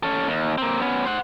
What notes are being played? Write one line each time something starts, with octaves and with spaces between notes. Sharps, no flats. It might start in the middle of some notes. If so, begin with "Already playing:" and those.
C#4 A4
D#2
A#3 C4
B3 C#4
C5 F#5